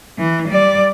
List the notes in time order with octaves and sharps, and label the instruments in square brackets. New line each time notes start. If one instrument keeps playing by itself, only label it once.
[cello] E3
G3 D5